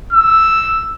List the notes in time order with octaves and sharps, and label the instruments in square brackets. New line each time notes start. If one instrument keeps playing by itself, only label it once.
[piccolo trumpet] E6